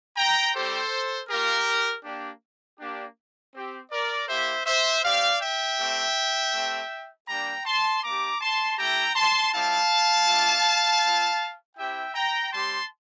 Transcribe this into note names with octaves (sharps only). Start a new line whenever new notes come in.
G5 A#5
G3 C4 G4 A4 C5
A#3 F4 G4 A#4
A#3 D4 G4
A#3 D4 G4
C4 G4
A#4 D5
A#3 E4 G4 C5 E5
C5 E5
C4 G4 D5 F5
E5 G5
A3 C4 G4
A3 C4 G4
G3 A#3 D4 G4 G5 A#5
A5 C6
A#3 D4 G4 A#5 D6
A5 C6
A3 E4 G4 G5 A#5
A5 C6
G3 C4 E4 F5 A5
A3 D4 F4
C4 F4
C4 E4 G4 E5 G5
G5 A#5
G3 C4 G4 A5 C6